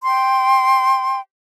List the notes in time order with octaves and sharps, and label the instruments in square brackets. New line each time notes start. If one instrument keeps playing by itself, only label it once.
[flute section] G5 C6